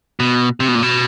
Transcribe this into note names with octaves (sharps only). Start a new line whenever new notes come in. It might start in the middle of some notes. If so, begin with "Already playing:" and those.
B2
C3
B2
A#2
B2